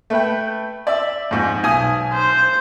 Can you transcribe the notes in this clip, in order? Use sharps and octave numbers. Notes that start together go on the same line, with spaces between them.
A3 B4 G5
D5 E5
F2 G#2
B1 G#5 D#6
C5